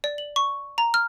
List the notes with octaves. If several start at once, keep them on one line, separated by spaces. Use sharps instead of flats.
D5
F#7
C#6
A#5
F6